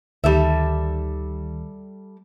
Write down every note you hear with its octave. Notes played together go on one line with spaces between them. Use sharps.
D2 D#3 G3 A4 E5